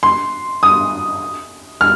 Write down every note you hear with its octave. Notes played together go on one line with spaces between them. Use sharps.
C6
D#6
F6